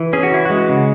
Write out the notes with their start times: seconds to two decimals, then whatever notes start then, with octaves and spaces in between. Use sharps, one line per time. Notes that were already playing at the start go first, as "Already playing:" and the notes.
Already playing: E3
0.13 C#4 G#4
0.23 F#4
0.32 E3 E4
0.45 G#3 F#4
0.69 C#3